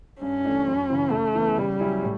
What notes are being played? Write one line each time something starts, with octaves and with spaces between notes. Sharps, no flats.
G2 C#4
E3 A3 D4
F#2
C#3 E3
C#3 A3
E3 B3 E4
C#3 G3
F#3 C#4 E4
A2